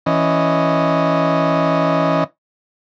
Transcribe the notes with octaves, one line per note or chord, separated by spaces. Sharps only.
E3 C#4 D#5